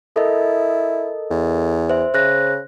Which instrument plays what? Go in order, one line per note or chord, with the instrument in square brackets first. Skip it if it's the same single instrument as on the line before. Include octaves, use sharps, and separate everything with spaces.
[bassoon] E4 [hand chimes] A4 A#4 D#5
[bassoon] E2
[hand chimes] C5 E5
[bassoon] C#3 [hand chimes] C5 F#6 A#6